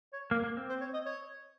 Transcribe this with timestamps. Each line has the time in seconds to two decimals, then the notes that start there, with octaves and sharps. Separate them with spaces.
0.13 C#5
0.31 A#3 A#4
0.44 A#3
0.57 C4
0.69 C5
0.81 C#5
0.94 D#5
1.06 C#5